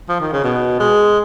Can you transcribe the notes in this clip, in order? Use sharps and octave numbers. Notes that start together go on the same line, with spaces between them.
F3
D#3
C#3
B2
G#3